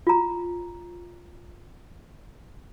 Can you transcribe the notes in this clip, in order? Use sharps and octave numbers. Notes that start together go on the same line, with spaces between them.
F4 A#5